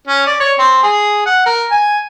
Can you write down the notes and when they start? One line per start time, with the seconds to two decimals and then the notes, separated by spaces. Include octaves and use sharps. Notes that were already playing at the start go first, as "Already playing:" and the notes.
0.07 C#4
0.27 D5
0.40 C#5
0.59 C4
0.83 G#4
1.26 F#5
1.46 A#4
1.71 G#5